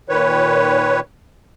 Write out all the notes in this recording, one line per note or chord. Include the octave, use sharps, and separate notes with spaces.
A#2 D#3 B4 C#5